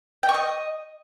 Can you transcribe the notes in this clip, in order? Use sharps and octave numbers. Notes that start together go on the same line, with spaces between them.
G5
C#6
D#5